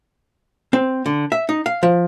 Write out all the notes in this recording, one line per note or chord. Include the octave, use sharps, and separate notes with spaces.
C4
D3
E5
D#4
F5
F3